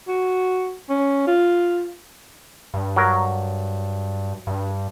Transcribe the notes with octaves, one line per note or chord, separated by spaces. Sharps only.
F#4
C#4
F4
G2
F#3 A#4
G2